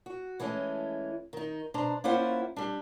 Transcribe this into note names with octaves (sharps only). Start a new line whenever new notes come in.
F#4
E3 G#3 A3 C#4
D#3 D#4
B2 D4 C5 A#5
A#3 C#4 E4 F4 C5 F#5
G3 D4